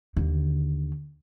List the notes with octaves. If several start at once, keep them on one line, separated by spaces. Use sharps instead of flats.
D#2 D3